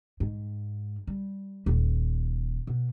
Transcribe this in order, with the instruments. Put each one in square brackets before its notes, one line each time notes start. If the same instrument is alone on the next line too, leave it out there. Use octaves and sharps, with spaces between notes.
[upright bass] G#2
G3
D#1
B2